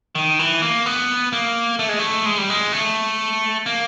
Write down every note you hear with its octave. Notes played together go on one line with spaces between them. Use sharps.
D#3
E3
A#3
B3
A#3
A3
G#3
A3
G#3
G3
G#3
A3
A#3